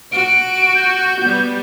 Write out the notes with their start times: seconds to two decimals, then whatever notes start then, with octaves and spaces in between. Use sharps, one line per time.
0.12 F#4 D7
0.75 G6
1.21 G3 B3